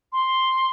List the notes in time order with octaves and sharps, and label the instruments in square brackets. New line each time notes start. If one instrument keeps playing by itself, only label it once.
[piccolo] C6